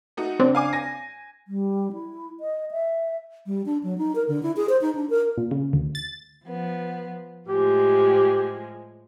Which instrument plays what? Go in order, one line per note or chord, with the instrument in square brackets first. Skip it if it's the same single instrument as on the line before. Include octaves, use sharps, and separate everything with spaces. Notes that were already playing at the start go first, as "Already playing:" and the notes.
[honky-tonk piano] A3 D#4 F#4
[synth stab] C#3 C4 D4
[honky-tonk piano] F5 G#5 D6
G#5 A#6
[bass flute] G3
E4
D#5
E5
G3
D4
F#3
D#4
A#4
D3
E4
G#4
C5
D#4
D4
A#4
[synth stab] A#2
C#3
D2
A6
[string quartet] F3 B3
[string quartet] A2 F3 G#3 [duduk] G4